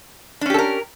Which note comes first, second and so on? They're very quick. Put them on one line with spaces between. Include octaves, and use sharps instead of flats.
D4 C#4 G4 A4 A#4